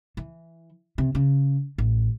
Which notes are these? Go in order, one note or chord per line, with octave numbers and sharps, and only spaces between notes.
E3
C3
C#3
A1